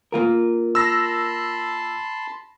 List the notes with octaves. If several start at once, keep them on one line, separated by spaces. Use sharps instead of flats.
A#3 F4 A#4
A5 B5 C6 E6 A#6